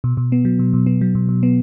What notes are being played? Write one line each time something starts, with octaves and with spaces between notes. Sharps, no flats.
B2
B2
B3
F#3
B2
B2
B3
F#3
B2
B2
B3